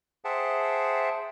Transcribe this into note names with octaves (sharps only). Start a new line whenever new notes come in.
G#4 C5 E5 F#5 G5 A5